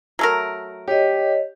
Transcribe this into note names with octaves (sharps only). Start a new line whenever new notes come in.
F#3 A3 A#4
G4 C#5 D#5